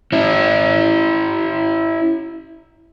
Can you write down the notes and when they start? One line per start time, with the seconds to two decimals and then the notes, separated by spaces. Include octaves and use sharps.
0.13 C#4 E4